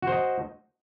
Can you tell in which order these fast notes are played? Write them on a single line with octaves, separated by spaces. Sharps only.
F#4 C5 D#5